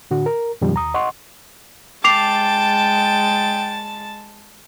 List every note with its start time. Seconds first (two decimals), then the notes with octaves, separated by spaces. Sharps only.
0.11 A2 D3 F#4
0.26 A#4
0.61 F#2 B2 D#3 F3 G3
0.74 D#2 A#5 D#6
0.94 D#5 F#5 C6 C#6
2.04 G#3 G5 A5 D6 A6 C7 F7